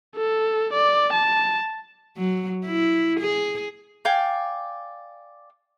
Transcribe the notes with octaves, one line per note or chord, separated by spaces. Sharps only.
A4
D5
A5
F#3
E4
G#4
D5 F5 G5 G#5